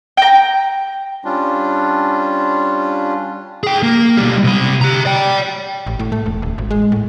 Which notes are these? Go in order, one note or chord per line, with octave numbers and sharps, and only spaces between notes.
G5 A#5
G3 C#4 D4 F4
G#4 G5
A#3
B2 G3
C3 B5
G4 A#5
D5 G5
A1
A2
A3
E1
D#1
G#1
G#3
A2